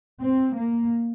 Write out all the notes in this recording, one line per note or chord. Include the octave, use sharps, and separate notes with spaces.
C4
A#3